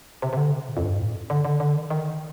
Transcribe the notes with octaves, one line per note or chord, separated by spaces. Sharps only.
C3
C3
D3
C3
A#2
F2
G2
A2
D3
D3
D3
D#3
D#3